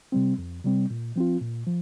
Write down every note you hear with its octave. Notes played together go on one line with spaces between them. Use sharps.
C3 G3 C4
F2
C3 G3 C4
A#2
F3 C4 F4
A#2
F3